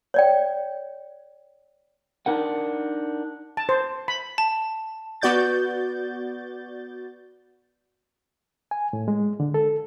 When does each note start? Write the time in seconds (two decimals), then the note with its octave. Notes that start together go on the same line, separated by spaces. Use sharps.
0.14 C#5 D5 G5
2.26 D4 D#4 A#4 F#5
3.57 A5
3.69 C5
4.08 B5
4.38 A5
5.21 B3 F#4 D5 G6 A6
8.71 G#5
8.93 A2
9.08 G#3
9.40 D3
9.54 A4